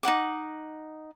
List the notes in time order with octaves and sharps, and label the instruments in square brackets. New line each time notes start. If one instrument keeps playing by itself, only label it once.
[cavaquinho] D#4 E4 F#5 D6